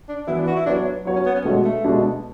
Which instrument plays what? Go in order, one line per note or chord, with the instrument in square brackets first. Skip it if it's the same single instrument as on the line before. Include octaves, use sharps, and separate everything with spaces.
[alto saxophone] D4
[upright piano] E3 B3 F#4 B4 [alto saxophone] E4
[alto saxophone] D4
F#4
E4
[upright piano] F#3 B3 F#4 C#5 [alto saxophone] D4
[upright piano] F#3 B3 F#4 C#5
[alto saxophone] C#4
B3
C#4
[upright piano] B2 G#3 D4 F#4 [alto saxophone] A3
[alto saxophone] A3
[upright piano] B2 G#3 D4 F#4